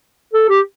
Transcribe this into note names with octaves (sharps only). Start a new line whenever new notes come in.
A4
G4